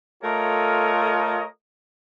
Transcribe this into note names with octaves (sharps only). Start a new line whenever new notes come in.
A3 F4 A4 A#4 C#5 D#5